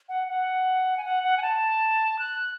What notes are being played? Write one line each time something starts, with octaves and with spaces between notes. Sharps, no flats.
F#5
F#5
G#5
F#5
F#5
G#5
A5
F#6